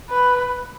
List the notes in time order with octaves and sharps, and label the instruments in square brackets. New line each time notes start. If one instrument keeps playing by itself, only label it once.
[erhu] B4